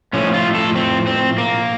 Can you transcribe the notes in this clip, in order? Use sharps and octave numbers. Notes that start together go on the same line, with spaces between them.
A2 F3 A3 C#4
F4
A4
C4
C4
A#3